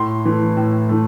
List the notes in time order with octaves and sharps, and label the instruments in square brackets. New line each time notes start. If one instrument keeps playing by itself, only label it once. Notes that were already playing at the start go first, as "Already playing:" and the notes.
Already playing: [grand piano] A2 C6
E3 A3
A2
E3 A3